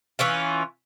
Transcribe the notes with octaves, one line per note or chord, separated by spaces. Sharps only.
E3 C#4 F4